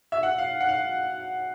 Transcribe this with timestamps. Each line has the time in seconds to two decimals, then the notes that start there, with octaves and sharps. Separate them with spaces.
0.12 E5
0.23 F#5
0.38 F5
0.61 F#5
0.69 F5